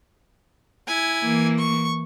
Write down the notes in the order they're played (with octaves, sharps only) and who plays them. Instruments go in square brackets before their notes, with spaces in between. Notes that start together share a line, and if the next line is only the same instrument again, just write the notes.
[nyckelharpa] E4 G#5
[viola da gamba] E3 A#3
[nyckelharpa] C#6